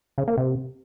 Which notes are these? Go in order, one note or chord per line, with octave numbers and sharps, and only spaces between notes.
C#3
A#3
C3